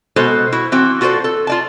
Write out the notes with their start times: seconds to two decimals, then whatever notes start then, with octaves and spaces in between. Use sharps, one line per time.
0.16 B2 G#3 F#4 A4 C5
0.52 E4 F#4
0.72 E3 C4 F#4
1.01 F4 F#4 A4 A#4 C5 D5
1.24 A4
1.47 F4 D5 A5